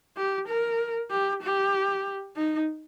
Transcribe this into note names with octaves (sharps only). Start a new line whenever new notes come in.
G4
A#4
G4
G4
D#4